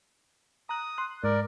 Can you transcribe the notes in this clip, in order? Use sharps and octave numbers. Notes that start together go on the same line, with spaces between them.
A#5 D#6 F#6
C6 F#6
G#2 A#4 D5